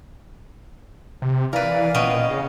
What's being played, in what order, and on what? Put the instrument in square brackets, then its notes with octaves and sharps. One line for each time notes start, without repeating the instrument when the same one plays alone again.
[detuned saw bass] C3
[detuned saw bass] E3 [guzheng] A#4 B4 [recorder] D5 [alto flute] F5
[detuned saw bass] A#2 [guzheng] B3 C#4 G5 [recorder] D#5
[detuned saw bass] C#3